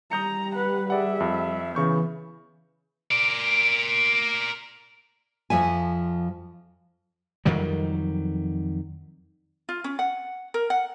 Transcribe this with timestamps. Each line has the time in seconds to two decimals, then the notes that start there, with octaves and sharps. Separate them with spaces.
0.12 G3 A#5 D#6 G6 C#7
0.55 B4 F#5
0.90 G#4 D5 E5 F#5
1.20 F2
1.75 C#3 E3 B3 C#6 G6
3.11 A#4 D5
5.50 F2 F3 E5 G#5
7.45 F2 D#3 F#3 G3
9.69 F4
9.84 C#4
9.99 F#5
10.54 A#4
10.70 F#5